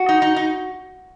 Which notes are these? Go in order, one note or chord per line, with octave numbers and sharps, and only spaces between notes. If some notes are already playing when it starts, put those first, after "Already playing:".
Already playing: F#4
D#4
D#4
D#4